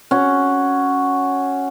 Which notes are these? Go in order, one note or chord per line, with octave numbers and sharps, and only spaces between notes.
C#4 F#4